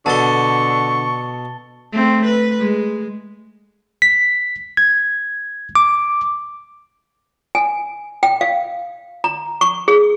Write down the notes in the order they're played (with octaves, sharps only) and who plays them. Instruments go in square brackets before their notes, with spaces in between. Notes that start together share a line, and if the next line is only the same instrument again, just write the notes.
[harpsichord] B2 A4 [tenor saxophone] D3 [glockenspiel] A5 A6 G7 [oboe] C#6
[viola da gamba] A3 C4
B4
G#3
[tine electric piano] B6
G#6
D6
[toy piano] G#5
G5
F5
A#5
C#6
G#4